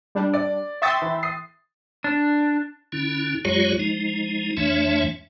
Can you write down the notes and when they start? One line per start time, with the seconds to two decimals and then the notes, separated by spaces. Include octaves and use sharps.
0.15 G3 D4
0.34 D5
0.82 E5 G5 C6 C#6 D#6 A6
1.02 E3
1.23 D#6 C7
2.04 D4
2.92 D3 C#4 E4
3.45 F#2 F#3 G#3 F4 G4 C#5
3.79 F3 G#3 D#4
4.57 F2 E3 A3 D4 C#5 E5